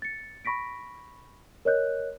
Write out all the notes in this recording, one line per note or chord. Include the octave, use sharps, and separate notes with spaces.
A6 C#7
B5 C#6 A#6 B6 D7
A#4 C#5 D#5 F#6 G6